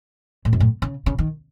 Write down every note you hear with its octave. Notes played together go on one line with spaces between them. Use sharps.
A2
F#2
A2
C#3
C#3
D#3